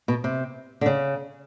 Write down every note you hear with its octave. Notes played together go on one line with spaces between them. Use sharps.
B2
C3
D3
C#3